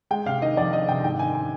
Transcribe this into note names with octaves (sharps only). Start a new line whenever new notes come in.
G#3 G5
C3 F5
D#3 D#5
F2 D5
D#3 D#5
C3 G5
G#2 G5
D#3 G#5
G#5